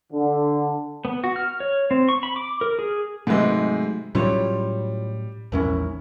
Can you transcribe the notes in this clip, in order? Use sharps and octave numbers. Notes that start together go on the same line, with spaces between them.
D3
B3
F#4
F6
C#5
C4
C#6
B5
D6
A#4
G#4
G#2 C3 F#3 G#3 A3 G#4 B4 D#5
A2 F#3 G3 C#4 E4 F4 C#5
A#1 E2 G#2 C#4 E4 A#4